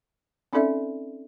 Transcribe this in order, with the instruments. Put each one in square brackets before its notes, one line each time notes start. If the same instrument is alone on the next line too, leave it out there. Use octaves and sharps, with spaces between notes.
[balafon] C4 C#4 D#4 A4 D5 E5